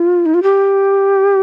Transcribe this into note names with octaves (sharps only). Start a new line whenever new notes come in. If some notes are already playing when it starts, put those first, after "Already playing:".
Already playing: F4
D#4
F4
G4